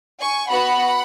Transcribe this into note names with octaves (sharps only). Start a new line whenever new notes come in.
G#5 C#6
B3 F#4 F#5 B5